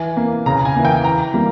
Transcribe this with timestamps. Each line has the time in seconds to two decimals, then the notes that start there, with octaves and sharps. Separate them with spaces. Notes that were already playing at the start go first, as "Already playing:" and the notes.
Already playing: E3 G#5
0.17 A#3
0.46 C#3 A#5
0.65 G#5
0.76 E3 A#3
0.85 G5
1.04 E3 A#5
1.34 G3 A#3